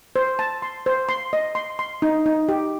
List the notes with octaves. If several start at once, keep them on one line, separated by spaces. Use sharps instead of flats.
C5
A5
C6
C5
C6
D#5
C6
C6
D#4
D#4
G4